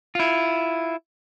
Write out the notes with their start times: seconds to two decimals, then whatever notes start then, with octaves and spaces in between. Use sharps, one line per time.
0.15 E4 F4